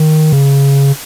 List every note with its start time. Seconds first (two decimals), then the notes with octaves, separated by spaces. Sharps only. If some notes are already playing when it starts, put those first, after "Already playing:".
Already playing: D#3
0.33 C#3